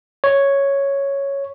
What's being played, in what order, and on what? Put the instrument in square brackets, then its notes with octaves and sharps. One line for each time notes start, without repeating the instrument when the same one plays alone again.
[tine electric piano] C#5